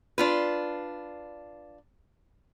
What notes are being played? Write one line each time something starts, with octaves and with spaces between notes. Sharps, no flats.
D4 F4 B4